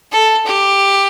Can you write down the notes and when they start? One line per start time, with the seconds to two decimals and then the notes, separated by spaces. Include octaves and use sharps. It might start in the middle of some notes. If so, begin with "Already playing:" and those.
0.12 A4
0.46 G4